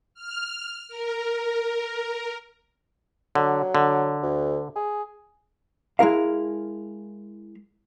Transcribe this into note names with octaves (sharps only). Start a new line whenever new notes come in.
F6
A#4
D3 F#3
D3
D2
G#4
G#3 E4 A#4 F5